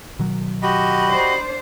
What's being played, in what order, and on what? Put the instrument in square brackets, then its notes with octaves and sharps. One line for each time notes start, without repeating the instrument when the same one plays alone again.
[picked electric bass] B2 D#3 F#3
[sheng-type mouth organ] F#4 G4 D#5 [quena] B5
[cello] D4 C5